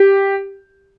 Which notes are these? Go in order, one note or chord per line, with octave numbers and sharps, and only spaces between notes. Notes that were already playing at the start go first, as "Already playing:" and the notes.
Already playing: G4